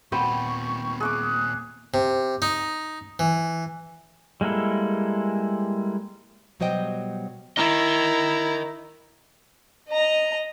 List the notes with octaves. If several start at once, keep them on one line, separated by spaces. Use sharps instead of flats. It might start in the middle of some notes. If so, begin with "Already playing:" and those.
D#2 A#2 B3 C4 G5 C#6
G#4 C#6 D6 F#6
C3
D#4
E3
G3 G#3 A#3 E4 A4
B2 F#3 G3 C5 D#5 G5
E4 A#4 D#5 A#5
D#5 A#5